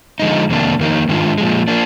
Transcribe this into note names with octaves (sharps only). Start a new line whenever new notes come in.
D3 F3 G#3 D#4
F2 C3 D#3 A#3 D4
F2 D#3 A#3 D#4
G#2 D#3 G#3 D4 F4
A#2 F3 G#3
F3 A#3 D4